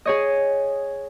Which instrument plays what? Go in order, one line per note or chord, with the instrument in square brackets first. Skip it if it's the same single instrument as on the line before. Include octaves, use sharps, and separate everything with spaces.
[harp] G#4 C#5 D#5